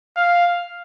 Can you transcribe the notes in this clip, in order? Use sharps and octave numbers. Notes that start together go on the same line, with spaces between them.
F5